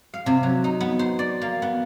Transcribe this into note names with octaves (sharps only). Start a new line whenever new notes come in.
F5
C3
F#3
D#4
B3
C5
D5
A#3
B3